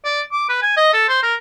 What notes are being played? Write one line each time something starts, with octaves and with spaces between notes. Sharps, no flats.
D5
D6
B4
G#5
D#5
A4
C5
A#4